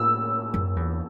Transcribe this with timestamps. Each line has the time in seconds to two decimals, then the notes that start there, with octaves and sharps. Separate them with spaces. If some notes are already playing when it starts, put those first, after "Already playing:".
Already playing: A2 E6
0.54 F#2
0.76 E2